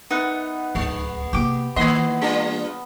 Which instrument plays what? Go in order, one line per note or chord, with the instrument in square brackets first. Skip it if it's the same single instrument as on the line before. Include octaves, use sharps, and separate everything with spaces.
[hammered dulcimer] B3 [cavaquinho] D#4 E5 F#5
[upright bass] D1 C#2 [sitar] G#3
[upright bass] C3 A#3 [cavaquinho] G4 D6
[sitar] D#3 D#5 [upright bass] E3 A#3 [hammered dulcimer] B3 [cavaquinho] C#5 C6
[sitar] G3 D4 F4